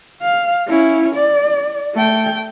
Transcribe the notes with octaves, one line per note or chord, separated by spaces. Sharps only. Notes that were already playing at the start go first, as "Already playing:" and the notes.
F5
C#4 E4
D5
A3 G5